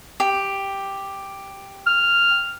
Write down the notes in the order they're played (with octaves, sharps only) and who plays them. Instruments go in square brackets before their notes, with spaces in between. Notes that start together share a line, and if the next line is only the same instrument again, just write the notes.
[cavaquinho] G4
[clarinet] F6